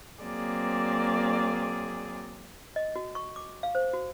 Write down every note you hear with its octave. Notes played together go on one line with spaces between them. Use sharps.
F#3 A#3 C4 G#4 D5
D#5
F#4
C#6
D6
F5
C5
F#4